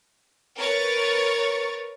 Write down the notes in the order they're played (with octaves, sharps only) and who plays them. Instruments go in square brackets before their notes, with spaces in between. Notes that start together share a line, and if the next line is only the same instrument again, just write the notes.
[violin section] A#4 B4 C#5 C#6 A6